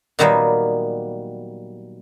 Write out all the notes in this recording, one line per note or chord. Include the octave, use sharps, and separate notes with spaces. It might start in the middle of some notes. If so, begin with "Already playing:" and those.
A#2 D#3 F#3 G3 A#3 B3